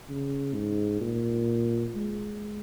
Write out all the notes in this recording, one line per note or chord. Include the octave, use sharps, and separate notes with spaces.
C#3
G#2
A#2
G#3